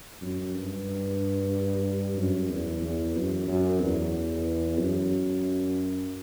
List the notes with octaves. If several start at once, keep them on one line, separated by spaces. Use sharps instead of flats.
F#2
G2
F#2
E2
E2
F#2
F#2
E2
F#2